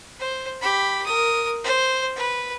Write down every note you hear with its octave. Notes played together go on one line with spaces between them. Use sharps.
C5
G4 B5
A#4 D#6
C5
B4